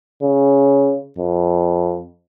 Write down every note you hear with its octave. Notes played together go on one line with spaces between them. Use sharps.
C#3
F2